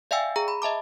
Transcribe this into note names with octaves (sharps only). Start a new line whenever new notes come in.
D5 E5 F5 G5 G#5 E6
G#4 A#5
B5
D#5 E5 A5 D6